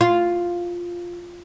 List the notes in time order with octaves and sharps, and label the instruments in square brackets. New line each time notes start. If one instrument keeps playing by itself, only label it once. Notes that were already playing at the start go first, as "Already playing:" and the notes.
[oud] F4